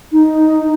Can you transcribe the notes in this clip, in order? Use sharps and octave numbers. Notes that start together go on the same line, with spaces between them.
D#4